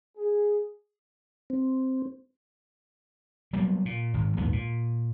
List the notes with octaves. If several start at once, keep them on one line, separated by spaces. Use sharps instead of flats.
G#4
C4
F#3 G3 A#3 B3
A#2
G#1
A#1 D#2 G#2 B3
A#2